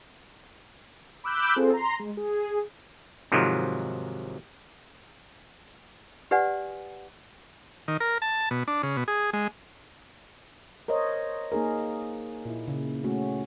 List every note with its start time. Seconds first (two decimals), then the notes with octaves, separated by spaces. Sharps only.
1.24 B5 D6 E6 F#6 G6
1.56 C4 F4 G#4 A4 C5
1.74 A#5 C6
1.99 G#3
2.17 G#4
3.32 G#2 C3 D#3 F3 F#3
6.31 G4 B4 D5 F#5 G#5
7.88 D#3
8.00 A#4
8.22 A5
8.51 B2
8.68 D4
8.83 C#3
8.97 B2
9.08 G#4
9.33 G#3
10.88 A#4 C5 C#5 D#5
11.52 A#3 D#4 G#4 A#4
12.45 A#2 E4
12.68 C#3
13.04 A3 C#4 F#4